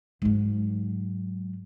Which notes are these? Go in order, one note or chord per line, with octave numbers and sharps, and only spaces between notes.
G#2 F#3